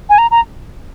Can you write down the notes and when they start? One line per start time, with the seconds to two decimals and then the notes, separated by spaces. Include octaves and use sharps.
0.09 G#5
0.18 A#5
0.31 A#5